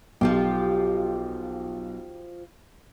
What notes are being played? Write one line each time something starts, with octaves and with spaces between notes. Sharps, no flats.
B1 F3 F4 G4